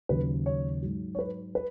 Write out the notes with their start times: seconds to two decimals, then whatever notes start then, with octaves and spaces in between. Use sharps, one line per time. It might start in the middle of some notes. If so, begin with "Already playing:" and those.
0.09 D#2 C#3 F#3 B4
0.46 C#5
0.82 G#2 F#3
1.15 C#5
1.19 B4
1.55 B4